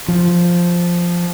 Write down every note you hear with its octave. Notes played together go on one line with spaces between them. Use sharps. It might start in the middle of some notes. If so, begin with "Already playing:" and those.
F3